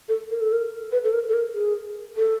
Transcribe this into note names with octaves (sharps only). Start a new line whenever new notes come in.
A4
A#4
A4
A#4
B4
A4
A#4
A4
A#4
G#4
A4